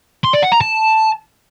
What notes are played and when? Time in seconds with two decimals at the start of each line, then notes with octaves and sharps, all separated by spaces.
0.24 C6
0.33 D5
0.42 F#5
0.52 A#5
0.61 A5